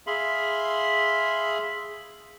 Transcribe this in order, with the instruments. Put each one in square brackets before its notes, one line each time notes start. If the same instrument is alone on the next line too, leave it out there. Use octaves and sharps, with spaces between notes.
[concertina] G#4 E5 F5 B5 C6